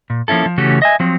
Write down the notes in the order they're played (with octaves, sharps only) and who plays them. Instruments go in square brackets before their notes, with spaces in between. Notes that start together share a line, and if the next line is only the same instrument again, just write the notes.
[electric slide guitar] A#2
F3 A#3 C#4 E4 A4
F3
C#3 E3 A3 C#4 F#4 G4
D#5 E5 G#5
F3 F#3 C4